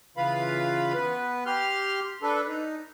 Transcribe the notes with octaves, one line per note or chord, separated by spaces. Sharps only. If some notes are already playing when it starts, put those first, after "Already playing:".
C#3 E3 F4 B4 F5 B5
B3 B4
G4 C6 F6
D4 A4 B4
D#4